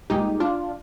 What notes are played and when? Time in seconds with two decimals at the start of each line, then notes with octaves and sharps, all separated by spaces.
0.10 C2 A#2 G#3 D#4 G4
0.40 D4 F4